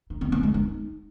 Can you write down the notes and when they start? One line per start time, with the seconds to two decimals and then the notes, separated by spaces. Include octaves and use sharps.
0.10 D#4
0.21 B3
0.32 B3
0.43 G#3
0.54 D#4